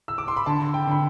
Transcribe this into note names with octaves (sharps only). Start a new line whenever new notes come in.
E6
D6
C6
B5
D3 A5
G5
D3 B5